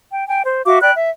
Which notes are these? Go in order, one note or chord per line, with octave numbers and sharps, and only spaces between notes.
G5
G5 G#5
C5
F#4 E5 F5 D6
D5 G5 B5 F#6
E5